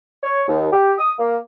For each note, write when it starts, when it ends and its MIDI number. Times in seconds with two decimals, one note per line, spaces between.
0.23 0.43 73
0.48 0.68 39
0.72 0.92 67
0.98 1.12 87
1.19 1.37 58